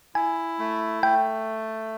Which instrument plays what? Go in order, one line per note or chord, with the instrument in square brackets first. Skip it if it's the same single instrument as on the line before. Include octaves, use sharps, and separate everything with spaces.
[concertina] E4 [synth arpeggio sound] G#5
[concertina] A3
[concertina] A3 [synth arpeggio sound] G5